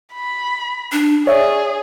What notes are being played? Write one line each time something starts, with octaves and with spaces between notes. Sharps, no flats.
B5
D4
G#4 C#5 D5 E5